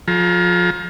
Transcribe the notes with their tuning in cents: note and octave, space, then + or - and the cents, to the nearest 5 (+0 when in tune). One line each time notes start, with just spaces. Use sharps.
F3 +20 A4 -40 A#5 +30